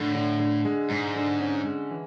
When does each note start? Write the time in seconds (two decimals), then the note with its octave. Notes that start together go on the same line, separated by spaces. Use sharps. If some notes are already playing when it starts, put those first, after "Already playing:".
Already playing: A2 D3
0.15 D3
0.40 D3
0.65 G#3
0.90 G#2 G#3
1.16 D3
1.40 C#4
1.65 G#3
1.91 E3